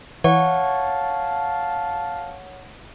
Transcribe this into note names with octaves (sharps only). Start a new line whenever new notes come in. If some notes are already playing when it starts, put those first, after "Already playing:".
E3 C#5 F5 F#5 A5 C#6